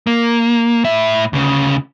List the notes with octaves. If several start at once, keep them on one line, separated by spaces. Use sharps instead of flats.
A#3
A2 E5
D2 C#3